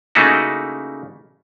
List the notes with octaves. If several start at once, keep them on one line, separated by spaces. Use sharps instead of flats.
C#3 A3 A#3 D#4 E4 F#4